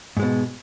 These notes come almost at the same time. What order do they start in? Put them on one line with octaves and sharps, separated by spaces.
G#2 G#3 B2